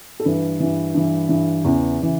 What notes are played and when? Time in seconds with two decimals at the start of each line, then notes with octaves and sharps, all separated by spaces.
0.20 A4
0.25 G2 E3 B4
0.60 G2 E3
0.94 G2 E3
1.29 G2 E3
1.64 E2 C#3 E3
2.01 C#3 E3